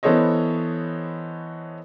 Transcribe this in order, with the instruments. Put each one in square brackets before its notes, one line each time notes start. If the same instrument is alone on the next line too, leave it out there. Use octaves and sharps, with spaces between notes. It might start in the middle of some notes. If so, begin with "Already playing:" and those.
[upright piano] E3 B3 A4 C5 C#5 D#5